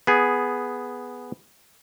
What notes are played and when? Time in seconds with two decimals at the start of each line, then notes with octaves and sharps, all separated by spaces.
0.07 B3 G#4